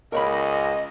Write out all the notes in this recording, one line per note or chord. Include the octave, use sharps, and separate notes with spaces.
C#2 A#4 C#5 D#5 B5